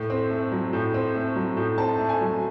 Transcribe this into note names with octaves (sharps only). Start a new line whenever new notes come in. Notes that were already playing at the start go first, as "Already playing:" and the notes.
Already playing: A2
C4
A3
F#3
A2
C4
A3
F#3
A2
C4 A5
A3
G#5
F#3